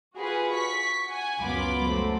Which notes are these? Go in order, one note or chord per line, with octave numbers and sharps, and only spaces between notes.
F4 F#4 G#4 B4
C#6 B6
F#5 G#5
C#2 F#2 B3 F4 B5 D6
F#3 A3 C5